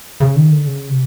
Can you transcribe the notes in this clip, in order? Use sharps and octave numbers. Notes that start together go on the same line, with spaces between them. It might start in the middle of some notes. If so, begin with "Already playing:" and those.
C#3
D#3
D3
C#3
C3